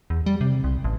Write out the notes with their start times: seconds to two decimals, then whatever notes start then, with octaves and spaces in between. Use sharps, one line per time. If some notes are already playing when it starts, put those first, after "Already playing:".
0.10 E2
0.26 G3
0.41 C3
0.64 C2
0.84 A1